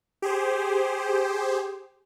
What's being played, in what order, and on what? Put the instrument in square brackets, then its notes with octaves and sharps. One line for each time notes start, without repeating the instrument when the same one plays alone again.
[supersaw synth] G4 G#4 C5